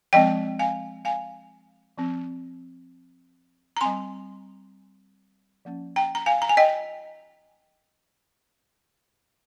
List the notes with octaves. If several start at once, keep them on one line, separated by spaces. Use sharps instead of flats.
F3 G#3 C4 D#5 G5
F5 G#5
F5 G#5
F3 C4
A#5
G3 C4 G#5 C6
F3 A#3 C#4
G5 A#5
A#5
F5 G#5
A#5
G#5
D#5 G5